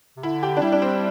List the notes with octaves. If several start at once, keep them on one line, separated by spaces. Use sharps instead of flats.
C3
D3 E4
G4
D4
G3 E4
D4
C4